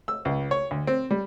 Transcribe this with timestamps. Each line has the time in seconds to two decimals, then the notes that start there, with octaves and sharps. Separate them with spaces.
0.08 E6
0.25 C#2
0.51 C#5
0.71 D2
0.87 C4
1.11 G3